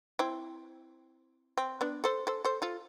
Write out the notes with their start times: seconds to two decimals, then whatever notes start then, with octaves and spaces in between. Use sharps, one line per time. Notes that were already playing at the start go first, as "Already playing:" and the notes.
0.19 C4 E4
1.57 C4
1.81 B3 D4
2.04 A4 C5
2.27 A4 C5
2.45 A4 C5
2.62 F4 A4